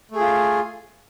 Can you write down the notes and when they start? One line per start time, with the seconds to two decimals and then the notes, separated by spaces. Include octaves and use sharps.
0.12 A3
0.16 G#4
0.20 F4